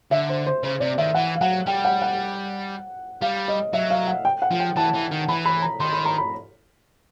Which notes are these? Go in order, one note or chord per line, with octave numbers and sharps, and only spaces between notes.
D3 E5
C5
C5
C#3 C5
C3 D5
D#3 E5
E3 F#5
F5
F#3 F#5
G3 G5
F#5
F#5
G3 F5
D#5
F#3 E5
F5
F#5
G5
F#5
F3
G5
E3 A5
E3
D#3
E3 B5
B5
A#5
D#3 C6
B5
A#5
B5